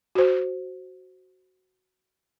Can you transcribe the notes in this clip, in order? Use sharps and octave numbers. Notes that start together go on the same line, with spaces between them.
F#4 C5